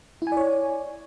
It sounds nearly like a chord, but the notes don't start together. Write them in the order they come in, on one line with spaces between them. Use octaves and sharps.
E4 G#5 D5 C#5